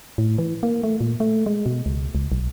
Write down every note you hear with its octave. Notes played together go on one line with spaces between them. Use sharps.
A2
E3
A#3
A3
A#2
A3
G#3
B2
C#2
C#2
B1